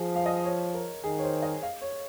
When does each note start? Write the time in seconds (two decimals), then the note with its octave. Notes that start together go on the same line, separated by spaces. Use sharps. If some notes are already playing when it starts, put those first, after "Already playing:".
Already playing: F3 G#4
0.16 F5
0.26 D#5
0.45 C#5
0.74 A#4
1.04 D#3 G#4
1.19 C#5
1.24 C5
1.42 D#5
1.62 F5
1.82 C#5